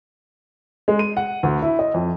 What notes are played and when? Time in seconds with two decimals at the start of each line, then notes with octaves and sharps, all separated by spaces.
0.88 G#3
0.99 D#7
1.17 F#5
1.43 D2
1.62 E4
1.79 D#5
1.94 F2